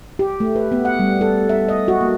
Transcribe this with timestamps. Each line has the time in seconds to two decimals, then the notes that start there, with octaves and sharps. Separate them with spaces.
0.19 G4
0.40 A3
0.56 B4
0.72 B3
0.85 F#5
0.99 G3
1.21 A4
1.49 E5
1.69 D#5
1.88 F#4
2.01 A#3